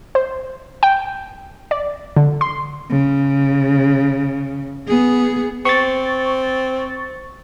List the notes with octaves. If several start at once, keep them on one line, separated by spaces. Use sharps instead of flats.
C5
G5
D5
D3
C6
C#3
B3 G#4
C4 C#6 A6